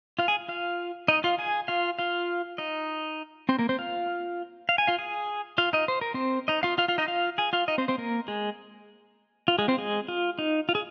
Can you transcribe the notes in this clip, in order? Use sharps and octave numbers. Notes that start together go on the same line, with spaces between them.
F4 F5
G#4 G#5
F4 F5
D#4 D#5
F4 F5
G#4 G#5
F4 F5
F4 F5
D#4 D#5
C4 C5
A#3 A#4
C4 C5
F4 F5
F5
G#5
F4 F5
G#4 G#5
F4 F5
D#4 D#5
C5
A#4
C4 C5
D#4 D#5
F4 F5
F4 F5
F4 F5
D#4 D#5
F4 F5
G#4 G#5
F4 F5
D#4 D#5
C4 C5
C4 C5
A#3 A#4
G#3 G#4
F4
G#3 G#4
C4 C5
G#3 G#4
F4
D#4
F4
G#4